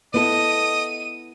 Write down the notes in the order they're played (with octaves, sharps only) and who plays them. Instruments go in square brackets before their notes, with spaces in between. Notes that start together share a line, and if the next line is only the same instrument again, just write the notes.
[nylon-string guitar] B3 E4 A4 [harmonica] D#5 [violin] D#7